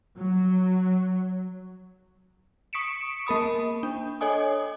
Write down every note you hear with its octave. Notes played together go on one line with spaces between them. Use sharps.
F#3
C#6 D#6 B6 C#7 D7 E7
A#3 A#4 B5 D#6
D4
A4 C#5 D#5 G#5 D#6